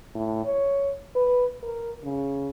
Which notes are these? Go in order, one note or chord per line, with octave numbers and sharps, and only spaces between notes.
A2
C#5
B4
A#4
C#3